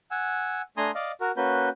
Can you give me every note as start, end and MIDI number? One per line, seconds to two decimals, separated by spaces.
0.11 0.62 78
0.11 0.62 80
0.11 0.62 88
0.77 0.91 57
0.77 0.91 62
0.77 0.91 80
0.77 0.91 82
0.77 0.91 84
0.77 0.91 87
0.95 1.12 74
0.95 1.12 75
0.95 1.12 77
1.21 1.31 66
1.21 1.31 70
1.37 1.69 58
1.37 1.69 61
1.37 1.69 66
1.37 1.69 71
1.37 1.69 91